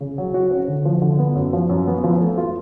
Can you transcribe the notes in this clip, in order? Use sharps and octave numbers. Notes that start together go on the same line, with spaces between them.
C#3
F#3
F#4
C#4
D3
F3
D3
B3
F#2
F3
F#2
B3
F3
A3
F4